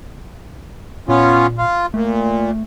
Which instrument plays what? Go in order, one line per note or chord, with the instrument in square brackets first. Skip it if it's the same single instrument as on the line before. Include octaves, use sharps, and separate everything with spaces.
[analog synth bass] A#2 [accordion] B3 C#4 F4
[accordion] F4
[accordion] A#2 [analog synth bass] A3